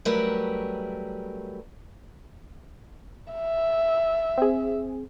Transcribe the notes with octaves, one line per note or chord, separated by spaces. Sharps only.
F#3 G3 A3 C#4 A#4 B4
E5
C4 G#4